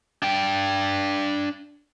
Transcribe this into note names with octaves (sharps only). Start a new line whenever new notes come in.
D4 G5